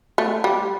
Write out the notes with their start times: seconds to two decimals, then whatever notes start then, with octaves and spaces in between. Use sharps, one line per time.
0.18 A3
0.44 G3